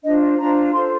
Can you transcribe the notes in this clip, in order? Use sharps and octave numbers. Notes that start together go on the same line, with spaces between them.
D4 F4 C5 D#5
D4 F4 C5 A#5
F4 A4 C5 C6